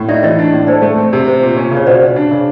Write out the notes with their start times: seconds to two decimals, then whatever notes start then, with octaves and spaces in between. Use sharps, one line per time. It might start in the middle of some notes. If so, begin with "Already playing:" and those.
Already playing: A2
0.08 D#4 D5 E5
0.23 E3 C#5 D#5
0.39 D4
0.53 A2
0.67 A4 C5 D5
0.82 A3
0.98 C4
1.13 C3
1.26 C4 C5
1.42 A#2
1.57 C#4
1.72 C#3
1.77 C#5
1.87 B2 C5 D5
2.02 B2
2.16 D4
2.31 C#3